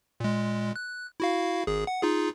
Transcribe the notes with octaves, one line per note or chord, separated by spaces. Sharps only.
A#2 G#3
F#6
E4 F#4 F5
G#1 G#4
F#5
D#4 F4 G#4